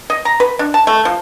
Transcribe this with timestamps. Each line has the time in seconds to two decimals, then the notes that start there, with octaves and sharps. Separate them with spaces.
0.10 D#5
0.25 A#5
0.40 B4
0.59 D4
0.74 A5
0.87 A3
1.05 F3